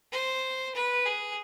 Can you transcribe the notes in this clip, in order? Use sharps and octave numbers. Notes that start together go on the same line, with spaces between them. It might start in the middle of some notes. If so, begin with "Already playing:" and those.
C5
B4
G#4